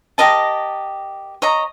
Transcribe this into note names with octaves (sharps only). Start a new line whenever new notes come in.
G4 A#4 D#5 A5
C#5 D#5 A#5